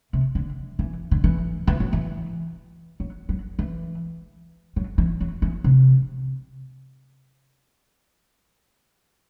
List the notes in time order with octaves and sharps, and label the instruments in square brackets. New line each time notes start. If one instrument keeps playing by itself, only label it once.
[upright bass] C3
D3
E3
D3
E3
E3
F#3
E3
F#3
F#3
E3
F#3
E3
F#3
E3
C3